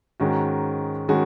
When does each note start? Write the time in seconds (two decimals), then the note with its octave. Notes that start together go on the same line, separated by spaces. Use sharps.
0.20 G#2 D#3 G#3 C#4 F#4
1.08 D#3 G#3 C#4 F#4